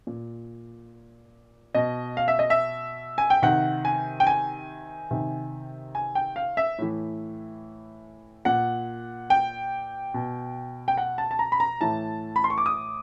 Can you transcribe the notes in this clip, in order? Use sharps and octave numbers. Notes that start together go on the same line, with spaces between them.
A#2
B2 D#5
F5
E5
D#5
E5
G#5
G5
C3 D#3 F#5
G#5
G5
G#5
C3 D#3
G#5
G5
F5
E5
A2 E3
A#2 F#5
G5
B2
G5
F#5
A5
A5
A#5
B5
A#5
A2 E3 A5
B5
C6
C#6
D6
D#6